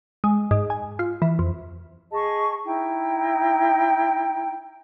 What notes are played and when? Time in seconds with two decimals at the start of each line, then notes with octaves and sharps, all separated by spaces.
0.24 G#3
0.51 G#2
0.70 G#5
0.99 F4
1.22 E3
1.39 F2
2.12 G#4 D#5 A5 C#6
2.65 D#4 E4 G5